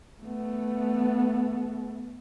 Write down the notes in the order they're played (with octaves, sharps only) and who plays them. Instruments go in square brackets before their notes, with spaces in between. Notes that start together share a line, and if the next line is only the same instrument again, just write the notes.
[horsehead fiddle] A3 B3